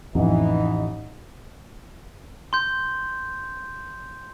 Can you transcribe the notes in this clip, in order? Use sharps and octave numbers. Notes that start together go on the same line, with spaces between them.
A1 F2 E3 D#4
C6 G6